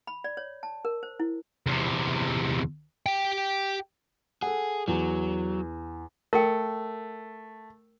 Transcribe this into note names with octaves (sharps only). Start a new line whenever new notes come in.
B5
D5
C#5
A5
A#4
C5
E4
E2 C3
G4 G5
G#4 A4 F#5
E2 F#3
A3 A#4 G5